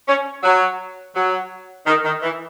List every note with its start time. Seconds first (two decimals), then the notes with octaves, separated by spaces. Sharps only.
0.07 C#4
0.43 F#3
1.15 F#3
1.86 D#3
2.04 D#3
2.22 E3